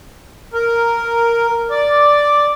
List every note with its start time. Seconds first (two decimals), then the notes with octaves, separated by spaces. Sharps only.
0.54 A#4
1.71 D5